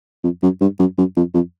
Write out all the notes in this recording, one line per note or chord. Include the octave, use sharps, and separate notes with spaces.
F2
F#2
G2
F#2
F#2
F2
F2